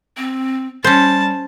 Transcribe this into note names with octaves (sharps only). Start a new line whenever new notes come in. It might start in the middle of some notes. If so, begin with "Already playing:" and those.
C4
G3 C#4 C5 A5